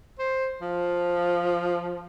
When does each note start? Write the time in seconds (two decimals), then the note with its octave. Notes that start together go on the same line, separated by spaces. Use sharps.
0.19 C5
0.61 F3